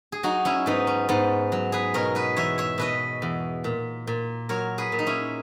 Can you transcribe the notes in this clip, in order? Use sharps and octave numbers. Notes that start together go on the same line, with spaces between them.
G#4
F#3 D#4 F#4
C#4 E4
G#2 B3 D#4
C#4
G#2 B3
F#3
G#4 B4
B2 A#4 C#5
B4 D#5
E2 C#5 E5
C#5 E5
B2 B4 D#5
E2
A#2
A#2
F#3 A#4 C#5
G#4 B4
A#2
D#4
C#4 E4